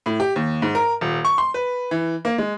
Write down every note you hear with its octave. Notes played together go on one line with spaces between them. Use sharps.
A2
G4
D#2
G#2
A#4
D#1
C#6
C6
B4
E3
A#3
G#3